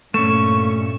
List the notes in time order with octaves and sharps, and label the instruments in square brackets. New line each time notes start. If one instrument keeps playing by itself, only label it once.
[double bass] G2 A#2 [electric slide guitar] A3 C#4 [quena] C#6 [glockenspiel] E7